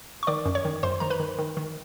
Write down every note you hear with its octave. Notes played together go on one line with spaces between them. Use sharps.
C#6
D#3 D5 D6
F#2
C#5 C#6
D#3
F#2 C5 C6
D#3 A#5
B4 B5
D#3
D#3
D#3